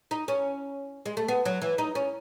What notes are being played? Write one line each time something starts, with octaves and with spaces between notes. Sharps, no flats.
D#4
C#4
G#3
A3
B3
F#3
E3
D#4
C#4